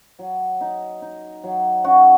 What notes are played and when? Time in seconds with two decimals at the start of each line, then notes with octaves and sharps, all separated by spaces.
0.19 F#3
0.61 D#4
1.02 D#4
1.44 F#3
1.84 C#4 F#4